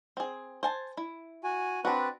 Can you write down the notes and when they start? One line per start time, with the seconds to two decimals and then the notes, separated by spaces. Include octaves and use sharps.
0.17 C4 G#4
0.63 C5 G#5 A5
0.97 E4
1.44 F#4 G#5
1.85 C4 D4 F#4 B4